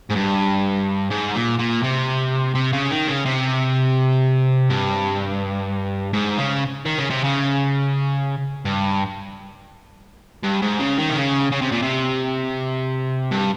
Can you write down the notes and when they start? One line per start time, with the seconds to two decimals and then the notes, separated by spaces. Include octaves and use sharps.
0.10 G#2
0.15 G2
1.11 G#2
1.35 A#2
1.59 A#2
1.83 C3
2.55 C3
2.73 C#3
2.91 D#3
3.08 C#3
3.26 C3
4.70 G2
6.13 G#2
6.38 C#3
6.85 D#3
6.98 C#3
7.10 C3
7.24 C#3
8.65 G2
10.44 G2
10.62 G#2
10.80 C#3
10.98 D#3
11.09 C3
11.16 C#3
11.52 C#3
11.61 C3
11.72 A#2
11.82 C3
13.31 G2